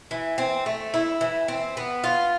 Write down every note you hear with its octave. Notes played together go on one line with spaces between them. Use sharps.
E3
C4
A3
E4
E3
C4
B3
F4